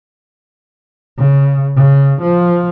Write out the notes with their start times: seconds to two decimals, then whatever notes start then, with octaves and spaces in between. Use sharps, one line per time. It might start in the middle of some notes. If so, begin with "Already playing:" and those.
1.18 C#3
1.76 C#3
2.22 F3